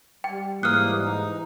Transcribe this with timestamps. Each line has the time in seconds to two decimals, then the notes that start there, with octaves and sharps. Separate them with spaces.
0.24 G3 G5
0.63 G#2 E3 A#3 D#6 F6 F#6
1.05 D#4